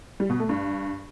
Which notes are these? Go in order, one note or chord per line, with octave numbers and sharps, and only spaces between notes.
G3
B2
A3
G2